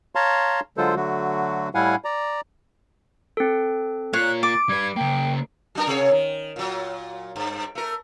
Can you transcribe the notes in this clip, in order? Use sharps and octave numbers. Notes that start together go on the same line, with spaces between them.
C#5 F5 A5 A#5 C6
D3 F#3 G#3 F4 A4 C5
D3 F#3 A3 F#4
A2 G3 E4 F5 F#5 G#5
D5 A#5
C4 A4
A#3 F4 C#5 F#6
D6 A6 D7
G3 B4 G#6
C#3 A#3 G5
F#3 D4 A#4
C3 G#4 C#5
D#3
A#2 F#3
G2
A3 A#4